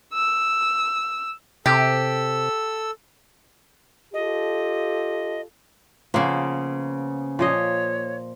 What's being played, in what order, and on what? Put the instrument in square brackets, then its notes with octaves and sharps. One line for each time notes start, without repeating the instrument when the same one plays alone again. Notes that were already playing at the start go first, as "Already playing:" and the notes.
[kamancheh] E6
[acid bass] C3 [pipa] G4 [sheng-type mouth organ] A4 E6
[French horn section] F4 G4 A4 [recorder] D#5
[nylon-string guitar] C#3 B3 [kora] F3 A#3
[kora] A#2 F3 D#5 [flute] C#5